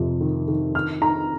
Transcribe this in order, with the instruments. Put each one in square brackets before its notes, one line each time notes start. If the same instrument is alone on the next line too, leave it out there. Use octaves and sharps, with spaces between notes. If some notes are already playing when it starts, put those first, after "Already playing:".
Already playing: [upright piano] F2 C3
D#3
D#3
D#4 F6
D#4 A#5